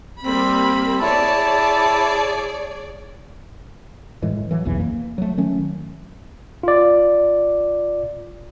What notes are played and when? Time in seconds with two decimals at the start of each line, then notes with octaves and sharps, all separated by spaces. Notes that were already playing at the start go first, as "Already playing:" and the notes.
0.23 G3 A#3 C4 B5
1.02 E4 G#4 C#5 D5 A5
4.22 A2 E3 G#3
4.51 E3 F#3
4.65 F#1 B1 E2 E3
4.80 A#3
5.18 F#3 A3
5.37 D#3 F#3 A3 C#4
6.63 F4 D5